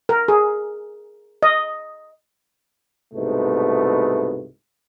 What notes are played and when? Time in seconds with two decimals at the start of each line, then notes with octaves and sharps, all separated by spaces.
0.09 A#4
0.28 G#4
1.43 D#5
3.14 C2 G#2 B2 A3